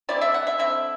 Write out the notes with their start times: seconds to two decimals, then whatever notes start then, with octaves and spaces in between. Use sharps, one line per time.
0.09 D3 G3 C4 E4 D5
0.21 E5
0.34 F#5
0.47 E5
0.58 D3 G3 C4 E4 E5